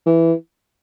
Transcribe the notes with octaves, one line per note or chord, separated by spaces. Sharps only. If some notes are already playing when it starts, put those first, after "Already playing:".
E3